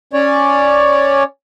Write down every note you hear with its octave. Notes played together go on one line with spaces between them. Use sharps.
C#4 C#5 D5